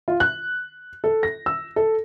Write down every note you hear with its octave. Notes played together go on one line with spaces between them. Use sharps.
F4
F#6
A4
A#6
E6
A4